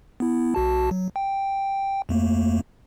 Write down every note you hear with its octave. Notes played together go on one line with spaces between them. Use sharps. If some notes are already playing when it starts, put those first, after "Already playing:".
B3 E4
B1 F#4 A5
F#3
G5
F2 A3 A#3